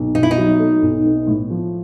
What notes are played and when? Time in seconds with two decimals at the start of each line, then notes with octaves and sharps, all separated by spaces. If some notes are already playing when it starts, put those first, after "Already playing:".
Already playing: B1
0.14 B2 D#4
0.23 E4
0.31 D#4
0.37 F#3
0.60 A3
0.82 B1
1.05 B3
1.27 A2
1.50 F3